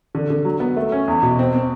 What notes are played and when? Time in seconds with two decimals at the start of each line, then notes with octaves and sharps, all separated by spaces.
0.15 D3
0.30 D3
0.45 F#3
0.60 B3
0.76 A3
0.92 C#4
1.08 E2
1.23 B2
1.39 C4
1.55 C4